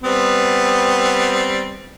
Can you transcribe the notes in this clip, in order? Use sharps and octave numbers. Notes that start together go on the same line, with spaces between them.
G3 B3 C4